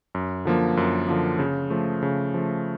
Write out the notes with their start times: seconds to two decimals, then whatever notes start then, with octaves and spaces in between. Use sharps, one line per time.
0.15 F#2
0.45 D3 F3 A#3
0.77 F#2
1.08 D3 F3 A#3
1.39 C#3
1.70 F3 A3
2.03 C#3
2.34 F3 A3